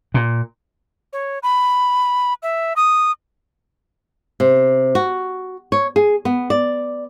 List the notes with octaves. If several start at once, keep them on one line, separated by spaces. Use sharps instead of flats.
A#2
C#5
B5
E5
D#6
C3
F#4
C#5
G#4
B3
D5